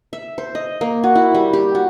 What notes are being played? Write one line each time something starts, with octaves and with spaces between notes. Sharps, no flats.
E5
C5
D#5
A#3
F#4
E4
G3
G4
F#4